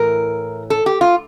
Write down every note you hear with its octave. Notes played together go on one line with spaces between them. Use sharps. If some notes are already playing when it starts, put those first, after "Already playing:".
Already playing: A2 E3 A#4
A4
G4
F4